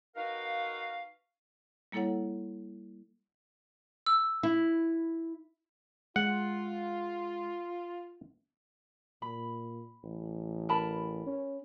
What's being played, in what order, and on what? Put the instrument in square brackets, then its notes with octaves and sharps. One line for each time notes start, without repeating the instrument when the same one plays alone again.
[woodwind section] D#4 F#4 A#4 B4 F5
[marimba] G3 A#3 E4 A4 C#5 F#5
[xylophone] E6
[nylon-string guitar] E4
[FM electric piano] G#3 [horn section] F4 [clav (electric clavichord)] F#5
[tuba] A#2 [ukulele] B5
[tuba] A1
[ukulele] A#4 A5 B5
[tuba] C#4